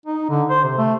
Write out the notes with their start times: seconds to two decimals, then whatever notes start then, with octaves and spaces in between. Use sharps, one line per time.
0.06 D#4
0.30 D3
0.50 C5
0.64 C3
0.78 A3